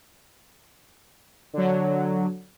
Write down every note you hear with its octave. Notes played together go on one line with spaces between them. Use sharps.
D3 F#3